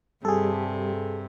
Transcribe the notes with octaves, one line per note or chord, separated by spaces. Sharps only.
G2 C3 G3 G#4 A4